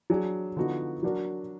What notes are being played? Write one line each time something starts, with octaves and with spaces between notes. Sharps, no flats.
F#3 D4 G#4
D3 F3 B3 D#4 F#4
F#3 D4 F#4 A#4